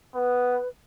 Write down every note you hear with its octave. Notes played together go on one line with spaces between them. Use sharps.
B3 B4